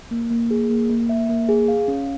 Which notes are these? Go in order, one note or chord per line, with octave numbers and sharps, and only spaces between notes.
A#3
A#3
G#4
A#3
A#3
E5
A#3
G#4
F5
C#4